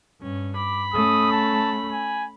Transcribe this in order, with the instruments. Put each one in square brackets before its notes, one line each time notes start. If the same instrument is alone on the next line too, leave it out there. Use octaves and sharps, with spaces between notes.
[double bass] G2 [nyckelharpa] C#4
[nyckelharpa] B5 [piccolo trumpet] D6
[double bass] A3 C#4 [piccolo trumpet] D#6
[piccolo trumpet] A5
G#5